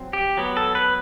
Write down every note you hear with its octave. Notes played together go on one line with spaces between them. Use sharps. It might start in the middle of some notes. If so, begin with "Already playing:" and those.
Already playing: F#3 C4
G4
F#3 B3
A4
B4